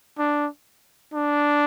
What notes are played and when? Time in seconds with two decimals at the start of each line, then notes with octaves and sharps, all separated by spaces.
0.18 D4
1.14 D4